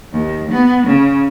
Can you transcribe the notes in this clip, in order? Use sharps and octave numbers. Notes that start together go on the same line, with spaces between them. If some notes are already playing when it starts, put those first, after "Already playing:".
D#2
B3
C#3